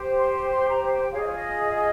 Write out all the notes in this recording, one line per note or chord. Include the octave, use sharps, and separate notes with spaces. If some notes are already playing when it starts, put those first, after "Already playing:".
Already playing: G4 C5
C6
C6
A#5
G5
F4 G#4 C#5 F5
D#5
C#5
D#5
D#5